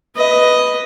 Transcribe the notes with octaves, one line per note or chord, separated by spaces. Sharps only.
B4 D#5